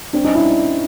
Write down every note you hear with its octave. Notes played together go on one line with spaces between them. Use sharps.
C4 D4
C#4 D#4
D4 E4